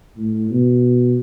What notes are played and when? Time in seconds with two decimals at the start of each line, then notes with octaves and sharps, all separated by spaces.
0.17 A2
0.50 B2